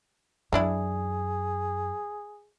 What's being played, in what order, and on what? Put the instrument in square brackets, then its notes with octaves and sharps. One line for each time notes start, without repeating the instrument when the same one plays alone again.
[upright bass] F#2 [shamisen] E3 D4 E4 [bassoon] G#4